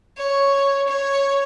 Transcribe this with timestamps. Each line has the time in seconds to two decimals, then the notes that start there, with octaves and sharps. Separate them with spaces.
0.17 C#5
0.88 C#5